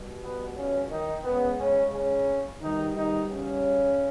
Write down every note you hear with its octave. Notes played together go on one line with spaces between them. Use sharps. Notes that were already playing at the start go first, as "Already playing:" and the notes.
Already playing: B2 G3
B3
C#3 C#4
D#3 D#4
C#3 G#3 B3
C#3 C#4
C#3 C#4
B2 D#3 G3 D#4
D#3 D#4
C#3 C#4